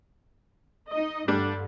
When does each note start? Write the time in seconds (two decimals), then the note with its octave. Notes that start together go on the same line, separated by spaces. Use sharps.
0.89 D#4 D#5
1.28 G2 D3 G3 D4